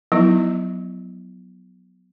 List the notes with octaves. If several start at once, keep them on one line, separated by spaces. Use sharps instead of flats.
F3 F#3 B3 D#4 E4